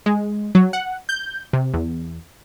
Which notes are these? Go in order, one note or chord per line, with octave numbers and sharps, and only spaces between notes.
G#3
F#3
F#5
G6
C3
E2